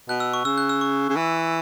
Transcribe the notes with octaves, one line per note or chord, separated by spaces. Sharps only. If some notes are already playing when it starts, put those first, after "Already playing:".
B2 F#6
E6
C#6
C#3 E6
F#6
E6
C#6
C#3
E3